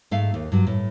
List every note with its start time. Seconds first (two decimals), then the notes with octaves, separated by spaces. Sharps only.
0.11 G#2 A3 F5
0.34 D#2
0.52 G2 F#3
0.67 A2